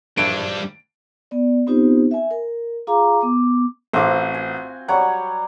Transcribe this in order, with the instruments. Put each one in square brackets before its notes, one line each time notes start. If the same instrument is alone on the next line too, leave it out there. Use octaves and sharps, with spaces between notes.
[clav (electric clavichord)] A#1 G2 E3 [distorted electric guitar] G3 D4 [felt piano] D7
[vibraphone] B3 D5
B3 C4 D#4 F4 G4 C5
E5 G#5
A#4
F4 G#4 F5 A#5 D6
B3 D6
[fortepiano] A1 D6 [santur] C4 F4 F#4
[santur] G#5
[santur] F#3 G3 C#5 [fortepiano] F#5